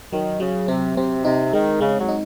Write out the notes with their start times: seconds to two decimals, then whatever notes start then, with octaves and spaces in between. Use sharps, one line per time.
0.12 D#3 F#3
0.40 C#3 F#3
0.68 C3 C4
0.97 C3 C4
1.25 C3 D#4
1.53 D#3 G#3
1.81 C#3 G#3
1.99 F#3
2.09 D#4